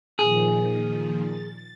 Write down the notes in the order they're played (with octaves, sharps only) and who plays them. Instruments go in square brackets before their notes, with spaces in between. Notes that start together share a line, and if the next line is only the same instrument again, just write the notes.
[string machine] A#2 D#3 F3 [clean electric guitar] G#4
[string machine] A6